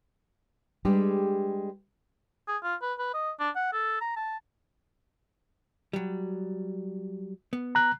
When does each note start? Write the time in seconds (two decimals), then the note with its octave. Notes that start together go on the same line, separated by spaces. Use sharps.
0.85 G3 G#3 D4 G4 G#4 B4
2.48 G#4
2.63 F4
2.82 B4
2.99 B4
3.14 D#5
3.40 D4
3.56 F#5
3.73 A4
4.01 A#5
4.16 A5
5.93 F#3 G3
7.53 B3
7.75 A#5 F#6